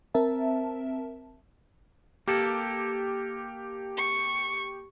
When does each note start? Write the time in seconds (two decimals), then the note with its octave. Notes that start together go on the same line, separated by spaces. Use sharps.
0.14 C4 A#4 E5 A5
2.28 A#3 G4 A4
3.97 C#6